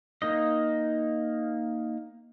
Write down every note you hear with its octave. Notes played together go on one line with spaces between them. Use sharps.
A#3 D#4 D#5